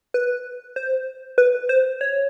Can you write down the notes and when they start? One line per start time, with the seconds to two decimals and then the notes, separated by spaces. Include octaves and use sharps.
0.14 B4
0.76 C5
1.38 B4
1.69 C5
2.01 C#5